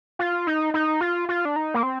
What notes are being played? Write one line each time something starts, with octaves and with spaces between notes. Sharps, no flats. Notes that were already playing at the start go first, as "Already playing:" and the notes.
F4
D#4
D#4
F4
F4
D4
D#4
A#3
C4